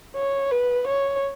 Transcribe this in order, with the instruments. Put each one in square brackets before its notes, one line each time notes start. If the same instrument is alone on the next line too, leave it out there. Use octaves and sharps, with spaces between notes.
[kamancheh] C#5
B4
C#5